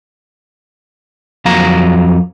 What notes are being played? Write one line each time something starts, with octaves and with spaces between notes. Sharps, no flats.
F2 F#3 F5 A#5